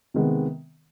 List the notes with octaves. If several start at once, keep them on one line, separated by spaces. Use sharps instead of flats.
C3 D#3 G#3 B3